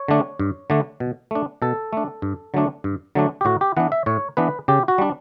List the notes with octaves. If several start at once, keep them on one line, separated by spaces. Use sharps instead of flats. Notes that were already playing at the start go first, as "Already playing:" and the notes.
Already playing: C#5
D3 A3 D4
G2
D3 A3 D4
B2
A3 D4
B2 A4
A3 D4
G2
D3 F#3 A3 D4
G2
D3 F#3 A3 D4
G4
A2 F#4
G4
E3 B3 D4 F#5
E5
A2 C#5
E3 B3 D4 B4
C#3 G4
F#4
G3 D4